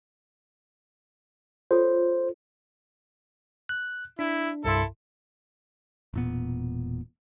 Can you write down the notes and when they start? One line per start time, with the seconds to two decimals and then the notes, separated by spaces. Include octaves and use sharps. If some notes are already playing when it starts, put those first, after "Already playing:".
1.71 F4 A4 C5 C#5
3.69 F#6
4.19 D4 E4
4.65 C2 G2 E4 A4 C6
6.14 E1 A#2 B3